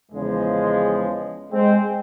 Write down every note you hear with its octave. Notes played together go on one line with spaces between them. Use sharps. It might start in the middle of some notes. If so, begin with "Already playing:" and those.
E2 C#3 F3 G#3
G#3 C4